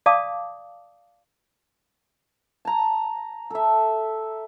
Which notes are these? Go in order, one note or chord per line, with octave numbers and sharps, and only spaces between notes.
D5 F5 A5 D6 D#6
A5 A#5
A4 E5